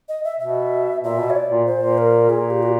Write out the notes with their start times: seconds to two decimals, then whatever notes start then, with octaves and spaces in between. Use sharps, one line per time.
0.09 D#5
0.24 E5
0.40 B2 E5
1.03 A#2 E5
1.19 B2
1.30 C#5
1.35 D5
1.50 A#2
1.66 C5
1.78 A#2
1.98 A#4
2.29 A#2 G#4
2.50 G4
2.63 F#4